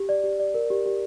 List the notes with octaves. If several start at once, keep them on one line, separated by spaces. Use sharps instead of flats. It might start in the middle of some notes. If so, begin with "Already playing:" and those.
Already playing: G4
D5
G4
D5
A#4
G4
G4